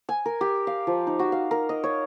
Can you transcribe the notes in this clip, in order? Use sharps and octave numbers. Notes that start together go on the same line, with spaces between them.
G#5
A#4
G4
F5
F3
D#4
F#4
F5
A#4
D#5
C#5